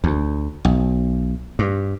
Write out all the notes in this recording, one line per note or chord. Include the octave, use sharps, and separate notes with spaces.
D2
B1
G2